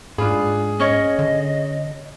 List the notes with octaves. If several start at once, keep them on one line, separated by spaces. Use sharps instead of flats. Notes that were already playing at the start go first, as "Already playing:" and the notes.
G#2 D4 F4 G#4 B5
C#4 C#5 D#5
D3